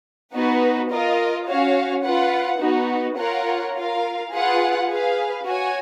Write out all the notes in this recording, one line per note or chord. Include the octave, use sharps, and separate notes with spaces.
B3 D#4 F#4 B4
F4 A#4 D#5
C#4 F#4 C#5 F5
F4 B4 F#5
B3 D#4 F#4
F4 A#4 C#5 F#5
F4 A#4 F5
F4 G#4 B4 F#5
G#4 B4 F5
F#4 C#5 G#5